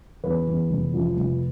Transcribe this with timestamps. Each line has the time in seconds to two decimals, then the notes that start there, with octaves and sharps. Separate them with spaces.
0.24 E2 B4
0.47 E2
0.70 F1
0.94 F3
1.17 F1